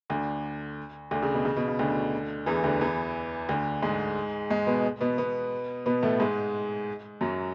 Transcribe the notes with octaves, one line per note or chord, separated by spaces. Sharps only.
D2 D3
D2 D3
C#3
B2
C#3
B2
C#3
D2 D3
E2 E3
D2 D3
E2 E3
D2 D3
G#2 G#3
G#2 G#3
B2 B3
B2 B3
B2 B3
B2 B3
A2 A3
G#2 G#3
F#2 F#3